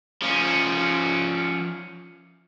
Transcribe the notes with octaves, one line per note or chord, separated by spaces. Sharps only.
F3 C#4